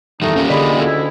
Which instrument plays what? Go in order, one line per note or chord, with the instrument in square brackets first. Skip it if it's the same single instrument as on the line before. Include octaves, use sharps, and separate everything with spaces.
[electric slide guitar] E2 D#3 G3 [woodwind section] A3 D#4
[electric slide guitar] A#3 F4 G4 [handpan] C#4
[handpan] D3 D5 D#5 [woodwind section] G#3 B5
[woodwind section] D2 E4